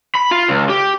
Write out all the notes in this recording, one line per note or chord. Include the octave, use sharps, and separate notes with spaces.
B5
F4
C#2
G4